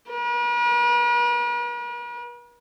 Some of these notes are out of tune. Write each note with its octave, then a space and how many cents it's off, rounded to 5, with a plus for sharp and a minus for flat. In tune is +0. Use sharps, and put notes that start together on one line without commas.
B4 -45